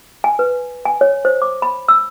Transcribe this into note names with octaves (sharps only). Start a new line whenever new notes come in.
G#5
B4
G#5
C#5
C5
D6
B5
E6